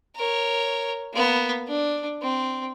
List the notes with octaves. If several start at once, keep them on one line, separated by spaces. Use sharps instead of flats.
A#4 C#5
A#3 B3
D4
C4